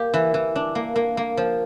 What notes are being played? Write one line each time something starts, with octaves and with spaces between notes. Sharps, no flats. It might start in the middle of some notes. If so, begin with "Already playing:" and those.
Already playing: A#3 G4
E3
E3
D4
A#3
A#3
A#3
F3